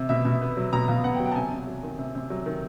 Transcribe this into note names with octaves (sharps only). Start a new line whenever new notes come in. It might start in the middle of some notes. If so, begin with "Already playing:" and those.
Already playing: C3
B2 E5
B2
B3
F#3
B2 A#5
B2 F5
B3 F#5
G5
F#3
G5
A5
C3 G#5
C3
F#3
D#3
C3
C3
F#3
D#3